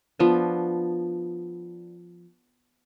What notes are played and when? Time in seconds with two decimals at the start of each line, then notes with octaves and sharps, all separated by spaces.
0.19 F3 B3 D4